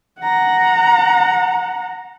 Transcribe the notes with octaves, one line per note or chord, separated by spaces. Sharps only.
F#5 A#5